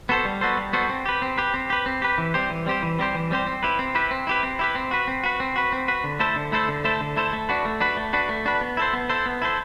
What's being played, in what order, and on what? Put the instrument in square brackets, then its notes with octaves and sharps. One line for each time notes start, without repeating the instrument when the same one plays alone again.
[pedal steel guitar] B3 F#4 A4 C5
G3
B3 F#4 A4 C5
G3
B3 F#4 A4 C5
C4
G4 B4
C4
G4 B4
C4
G4 B4
C4
G4 B4
E3
G3 C4 G4 C5
E3
G3 C4 G4 C5
E3
G3 C4 G4 C5
E3
G3 C4 G4 C5
C4
E4 G4 B4
C4
E4 G4 B4
C4
E4 G4 B4
C4
E4 G4 B4
C4
F#4 B4
C4
F#4 B4
C4
F#4 B4
C4
F#4 B4
D3
A3 E4 A4 C5
D3
A3 E4 A4 C5
D3
A3 E4 A4 C5
D3
A3 E4 A4 C5
A3
D4 F#4 B4
A3
D4 F#4 B4
A3
D4 F#4 B4
A3
D4 F#4 B4
B3
E4 A4 C5
B3
E4 A4 C5
B3
E4 A4 C5